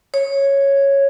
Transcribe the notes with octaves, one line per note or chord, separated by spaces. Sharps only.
C#5